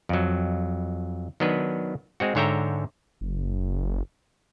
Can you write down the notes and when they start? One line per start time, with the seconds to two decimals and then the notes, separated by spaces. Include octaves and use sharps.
0.09 F2 F#3
1.40 D#3 F#3 B3 D4 B4
2.20 G#3 C4 F#4
2.35 G#2 D3 C#5 E5 G5 A#5
3.21 F#1